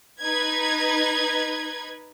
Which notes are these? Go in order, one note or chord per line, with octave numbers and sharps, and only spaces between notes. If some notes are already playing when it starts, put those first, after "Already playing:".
D#4 B4 G#6